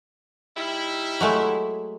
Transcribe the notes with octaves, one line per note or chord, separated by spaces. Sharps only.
G3 D#4 E4
F#3 G#3 A3